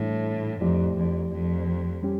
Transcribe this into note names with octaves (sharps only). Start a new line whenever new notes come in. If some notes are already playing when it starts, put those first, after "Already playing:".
Already playing: A2 E3 G3 D4
F2 F3 A3 E4 G4 D5
F2
F2
G3 C#4 G4